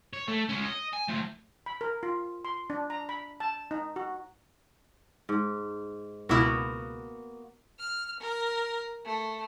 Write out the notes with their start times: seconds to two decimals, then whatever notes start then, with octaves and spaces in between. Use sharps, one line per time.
0.13 C#5
0.28 A3
0.49 G#3 C#4
0.65 D#5
0.93 G#5
1.09 A3 C4
1.66 B5
1.81 A#4
2.03 F4
2.45 C6
2.70 D4
2.90 A#5
3.09 B5
3.40 A5
3.71 D#4
3.96 F#4
5.29 G#2
6.29 C#2 B2 A#3 B3 E4 F#4
7.79 F6
8.20 A#4
9.05 A3